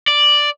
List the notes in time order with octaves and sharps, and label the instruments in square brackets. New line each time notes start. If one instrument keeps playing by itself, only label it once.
[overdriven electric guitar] D5